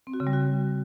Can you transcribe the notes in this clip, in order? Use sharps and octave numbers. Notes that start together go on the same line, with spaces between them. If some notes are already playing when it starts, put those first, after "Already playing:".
C4
F#4
C#3
G3
F#4